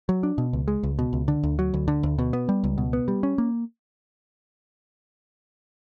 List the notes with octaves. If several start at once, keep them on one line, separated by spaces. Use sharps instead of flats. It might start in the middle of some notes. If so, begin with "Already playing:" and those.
F#3
D4
B2
C#2
G#3
C#2
B2
C#2
D3
D2
F#3
D2
D3
D2
B2
B3
G3
C#2
B2
B3
G3
C#4
A#3